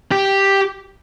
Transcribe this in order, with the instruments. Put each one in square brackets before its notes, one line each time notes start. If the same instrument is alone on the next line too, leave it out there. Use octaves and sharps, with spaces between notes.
[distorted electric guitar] G4